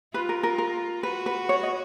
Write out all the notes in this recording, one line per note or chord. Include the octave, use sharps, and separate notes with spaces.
F4 B4
A#4
A#4
A#4
F#4 B4
B4
C#5
D#5